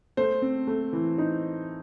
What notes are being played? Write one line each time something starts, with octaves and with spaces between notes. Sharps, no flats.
A3 C5
C4
A3
E3
D#4